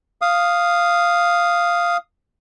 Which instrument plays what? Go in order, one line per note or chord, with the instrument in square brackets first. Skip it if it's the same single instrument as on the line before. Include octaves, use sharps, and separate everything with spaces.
[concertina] F5 D#6